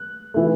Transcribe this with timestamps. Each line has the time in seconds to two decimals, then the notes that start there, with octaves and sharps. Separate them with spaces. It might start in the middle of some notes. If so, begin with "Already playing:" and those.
Already playing: F#6
0.34 E3 A3